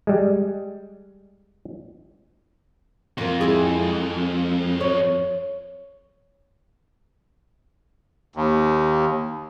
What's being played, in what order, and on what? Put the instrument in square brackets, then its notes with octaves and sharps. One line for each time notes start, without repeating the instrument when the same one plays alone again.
[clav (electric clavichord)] G3 G#3
[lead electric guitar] F2 [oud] A#3 F4
[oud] G#3 E4 G#4
C#5
[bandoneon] D#2